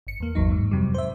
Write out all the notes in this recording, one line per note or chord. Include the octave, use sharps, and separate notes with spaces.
G1 C#7
E2 A#3
G#1 E2 F#3 D#4
G#2
F2 C3 F#3 G3
C5 E5